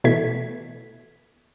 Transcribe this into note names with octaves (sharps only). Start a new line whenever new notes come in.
B2 E3 A3 G#6 B6